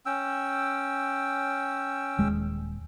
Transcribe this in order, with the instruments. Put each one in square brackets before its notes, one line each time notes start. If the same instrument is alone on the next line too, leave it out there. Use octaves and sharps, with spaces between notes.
[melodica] C#4 G5 E6
[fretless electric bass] D#1 G#3